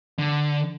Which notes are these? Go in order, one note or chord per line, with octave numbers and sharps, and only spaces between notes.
D3